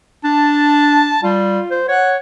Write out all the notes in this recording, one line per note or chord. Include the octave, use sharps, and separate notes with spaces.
D4 A5
G3 F4
C5
C#5 F#5